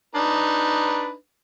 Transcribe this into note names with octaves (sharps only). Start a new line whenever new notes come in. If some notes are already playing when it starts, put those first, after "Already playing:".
D4 D#4 B4